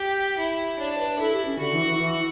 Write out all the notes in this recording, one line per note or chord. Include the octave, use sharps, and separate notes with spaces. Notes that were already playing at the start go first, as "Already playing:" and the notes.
Already playing: G4
E4
D4 C#5
B4
E4 A4
G4
C#4
D3 F#4
E3
E3
E3